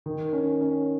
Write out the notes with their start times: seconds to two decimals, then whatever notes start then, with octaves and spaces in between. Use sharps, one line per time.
0.06 D#3
0.33 C#4
0.61 C#4